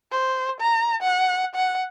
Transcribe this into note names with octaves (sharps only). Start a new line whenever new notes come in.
C5
A#5
F#5
F#5